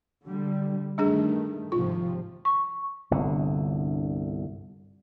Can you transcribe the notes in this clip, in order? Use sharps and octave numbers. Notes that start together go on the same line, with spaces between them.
D3 G3
G2 D#3 G3 A3 D4 G#4
G#1 C3 F3 F4
C#6
G1 C2 D3